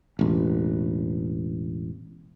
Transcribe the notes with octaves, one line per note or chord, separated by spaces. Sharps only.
E1 A1